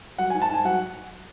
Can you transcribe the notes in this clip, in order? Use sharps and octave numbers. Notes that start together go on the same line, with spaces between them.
F#3 F#5
G#5
G#2
A5
G#2 G#5
F#3 F#5